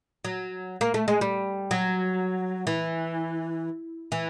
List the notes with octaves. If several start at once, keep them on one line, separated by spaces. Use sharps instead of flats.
F#3
A#3
A3
G#3
G3
F#3
E3
E3